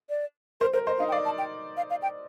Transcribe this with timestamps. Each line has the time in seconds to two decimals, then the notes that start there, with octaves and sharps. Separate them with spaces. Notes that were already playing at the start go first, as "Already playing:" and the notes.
0.10 D5
0.61 A#4 C5
0.73 A#4 C5
0.87 C5 D#5
0.99 D#4 F5
1.08 G5
1.12 D5 F5
1.25 A5
1.38 G5
1.77 F5
1.90 F5
2.02 G5